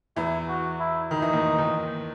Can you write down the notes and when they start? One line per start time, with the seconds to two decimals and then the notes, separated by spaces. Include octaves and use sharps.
0.17 E2 E3 E4
0.49 F#4
0.80 E4
1.11 D#3 D#4
1.22 E3
1.33 D#2 D#3
1.58 D#2 D#3